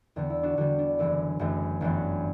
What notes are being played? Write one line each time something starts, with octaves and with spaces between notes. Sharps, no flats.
E2 D3 G3 B3
E4
D4 F#4
E2 D3 G3 B3 D4 F#4
D4
F#1 F#2 E3 A3 E4
F#1 F#2 E3 A3
G1 F#2 E3 B3